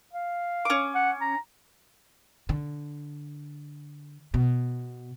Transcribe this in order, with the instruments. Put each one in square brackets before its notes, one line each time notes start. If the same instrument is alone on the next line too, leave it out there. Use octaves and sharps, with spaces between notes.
[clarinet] F5
[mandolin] C#4 D6
[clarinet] F#5
A#5
[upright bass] D3
B2